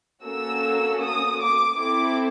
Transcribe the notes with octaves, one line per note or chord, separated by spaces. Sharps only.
A#3 C#4 F#4 A4 E6
D#6
D6
C4 E4 A4 D6